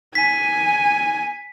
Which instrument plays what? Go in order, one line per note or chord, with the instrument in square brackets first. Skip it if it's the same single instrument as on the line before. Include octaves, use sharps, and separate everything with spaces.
[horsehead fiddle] G#5 [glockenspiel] B6